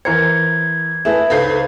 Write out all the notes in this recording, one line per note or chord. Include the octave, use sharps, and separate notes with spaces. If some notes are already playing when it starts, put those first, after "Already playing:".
E3 A#4 C5 G#6 C#7
A3 E4 G#4 B4 E5
C#2 D#4 A4 B4 C5 G6 C7